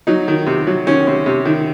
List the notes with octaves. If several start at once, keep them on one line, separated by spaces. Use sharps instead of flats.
F#3 D#4
D#3
C3
F#3
D#3 C#4
C3
C3
D#3